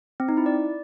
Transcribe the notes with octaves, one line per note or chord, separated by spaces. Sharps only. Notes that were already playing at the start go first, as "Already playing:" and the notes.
C4
D#4
E4
D5